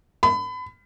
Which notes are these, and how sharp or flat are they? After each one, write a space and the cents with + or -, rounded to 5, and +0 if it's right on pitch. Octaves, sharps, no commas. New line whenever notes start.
B5 +30